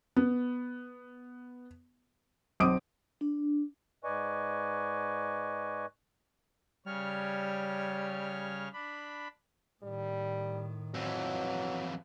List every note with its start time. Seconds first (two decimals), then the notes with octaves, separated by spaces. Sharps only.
0.16 B3
2.60 B1 C4 D6 D#6 D7
3.21 D4
4.04 G#2 B4 D5 D#5 G#5 C#6
6.86 C#3 G3 C#5 F6
8.73 D4 B5
9.83 A2 D#3 G3
10.95 F2 E3 F#3